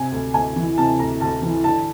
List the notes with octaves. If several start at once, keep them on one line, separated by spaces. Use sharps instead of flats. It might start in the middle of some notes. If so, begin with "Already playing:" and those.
Already playing: C3 G#5
D2
D2 G#5
E3
C3 A5
D2 A#5
D2 A5
E3
D3 A5